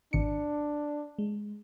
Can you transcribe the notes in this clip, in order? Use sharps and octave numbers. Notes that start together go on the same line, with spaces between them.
G#1 D4 C#7
G#3